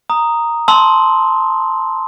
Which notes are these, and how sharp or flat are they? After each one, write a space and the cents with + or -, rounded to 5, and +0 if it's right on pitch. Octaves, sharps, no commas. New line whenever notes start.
A#5 +0 D#6 +0
A5 +0 C6 +0 E6 -35